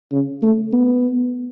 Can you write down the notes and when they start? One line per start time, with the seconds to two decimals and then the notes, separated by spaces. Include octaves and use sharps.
0.12 C#3
0.42 A3
0.73 B3